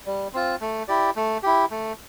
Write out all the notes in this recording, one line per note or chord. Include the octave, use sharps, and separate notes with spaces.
G3
C4 F4
A3
E4 G4 D5
A3
E4 G4
A3